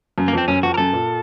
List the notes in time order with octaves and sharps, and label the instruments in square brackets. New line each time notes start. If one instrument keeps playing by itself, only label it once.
[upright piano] F#2
[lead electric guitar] A#3
[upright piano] F2 [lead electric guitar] C4
[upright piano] F#2 [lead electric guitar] C#4
[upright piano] F2 [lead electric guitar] F#4
[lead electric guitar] A#4
[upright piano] F#2 [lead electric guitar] A4
[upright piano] A#2